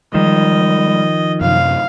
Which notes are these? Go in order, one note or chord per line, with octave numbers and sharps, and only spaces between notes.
D#3 F3 G3 G#3 D#5
F#2 C3 F5